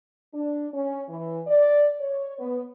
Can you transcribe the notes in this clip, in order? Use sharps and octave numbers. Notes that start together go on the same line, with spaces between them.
D4
C#4
E3
D5
C#5
B3